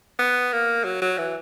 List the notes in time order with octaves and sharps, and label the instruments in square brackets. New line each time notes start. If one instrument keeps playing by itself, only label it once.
[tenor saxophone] B3
A#3
F#3
F#3
E3